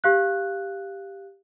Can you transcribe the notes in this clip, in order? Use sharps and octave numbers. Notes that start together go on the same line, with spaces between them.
G4 F5 F#6